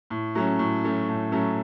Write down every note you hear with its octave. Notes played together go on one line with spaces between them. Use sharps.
A2
F#3 A3 C#4
A2
F#3 A3 C#4
A2
F#3 A3 C#4